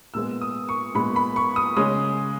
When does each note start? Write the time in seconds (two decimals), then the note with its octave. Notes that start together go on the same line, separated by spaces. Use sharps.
0.14 A#2 G#3 B3 E6
0.41 D#6
0.69 C#6
0.95 A#2 G#3 B3 B5
1.16 B5
1.36 C#6
1.56 D#6
1.77 C#3 G#3 C#4 D#6